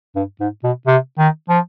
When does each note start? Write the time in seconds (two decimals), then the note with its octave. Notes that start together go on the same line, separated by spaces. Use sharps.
0.16 G2
0.40 G#2
0.64 B2
0.87 C3
1.18 D#3
1.49 F3